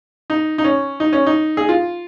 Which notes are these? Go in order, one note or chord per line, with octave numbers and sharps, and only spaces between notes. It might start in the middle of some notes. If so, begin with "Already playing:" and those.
D#4
D#4
C#4
D#4
C#4
D#4
G#4
F4